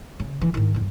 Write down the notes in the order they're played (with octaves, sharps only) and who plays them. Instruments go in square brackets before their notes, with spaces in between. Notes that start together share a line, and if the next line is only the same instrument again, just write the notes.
[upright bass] C#3
E3
G#2 D#3
E2 G2